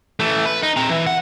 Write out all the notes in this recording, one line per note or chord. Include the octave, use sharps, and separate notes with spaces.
E3 A3
B4
D#4
C4 A#5
E3
F#5